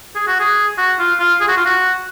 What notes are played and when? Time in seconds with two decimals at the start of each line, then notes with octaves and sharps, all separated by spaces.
0.16 G#4
0.27 F#4
0.40 G#4
0.78 F#4
0.99 F4
1.20 F4
1.41 G#4
1.49 F#4
1.57 F4
1.66 F#4